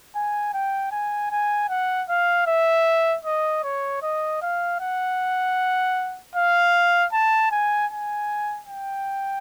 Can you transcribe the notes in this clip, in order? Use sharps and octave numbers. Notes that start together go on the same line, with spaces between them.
G#5
G5
G#5
G#5
F#5
F5
E5
D#5
C#5
D#5
F5
F#5
F5
A5
G#5
G#5
G5